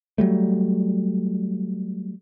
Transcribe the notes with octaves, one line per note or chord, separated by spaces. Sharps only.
F#3 G3 A3